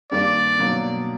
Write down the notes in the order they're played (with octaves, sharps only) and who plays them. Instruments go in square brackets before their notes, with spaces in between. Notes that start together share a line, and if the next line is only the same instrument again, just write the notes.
[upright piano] G2 D#3 G3 A#3 D4 [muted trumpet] D5
[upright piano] B2 F#3 A#3 D4